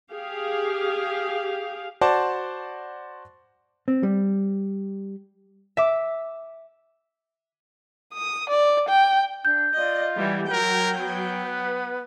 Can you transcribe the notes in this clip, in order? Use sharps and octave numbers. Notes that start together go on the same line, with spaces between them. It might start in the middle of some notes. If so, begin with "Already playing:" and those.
G4 G#4 F5
F#4 C5 D5 A5
C4
G3
E5 D6
D#6
D5
G5
D4 G6
F4 D5 D#5
E3 G3 F#5
F#3 A#4 G5
B3
B4